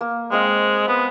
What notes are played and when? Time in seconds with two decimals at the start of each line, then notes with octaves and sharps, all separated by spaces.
0.01 A#3
0.32 G#3 C4 D#5 F5
0.88 B3 G#5